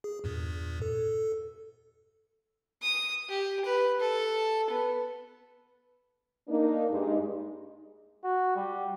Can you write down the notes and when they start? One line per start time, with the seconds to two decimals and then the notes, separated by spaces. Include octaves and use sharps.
0.04 G#4
0.24 E2 G2 A#2
0.82 A4
2.82 D#6
3.29 G4
3.65 B4
4.00 A4
4.70 B3
6.48 A#3 D4 D#4
6.90 G2 G#3 D#4
8.24 F#4
8.56 G3